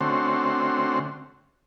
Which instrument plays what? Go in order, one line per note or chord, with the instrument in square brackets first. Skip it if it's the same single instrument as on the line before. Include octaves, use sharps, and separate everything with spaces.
[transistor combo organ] D3 A3 C4 C#4 F#4 C5